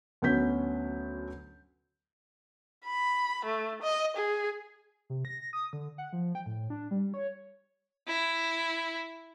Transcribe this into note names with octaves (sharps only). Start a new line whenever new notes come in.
D2 F#3 B3 C#4 G6 B6
B5
A3
D#5
G#4
C3
A#6
D#6
D3
F#5
F3
G5
A2
D4
G3
C#5
E4